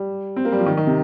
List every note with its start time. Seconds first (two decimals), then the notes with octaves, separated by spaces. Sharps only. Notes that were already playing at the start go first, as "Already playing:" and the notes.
Already playing: G3
0.36 C4
0.45 A#3
0.52 G3
0.59 F3
0.66 D#3
0.77 D#3
0.87 C3